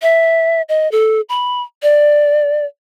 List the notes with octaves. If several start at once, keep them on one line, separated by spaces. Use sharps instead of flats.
E5
D#5
A4
B5
D5